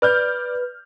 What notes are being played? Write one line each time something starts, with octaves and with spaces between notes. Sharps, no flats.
B4 D5 F6 G6